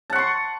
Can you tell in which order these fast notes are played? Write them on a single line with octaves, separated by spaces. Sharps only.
A5 F#5 C#6 C6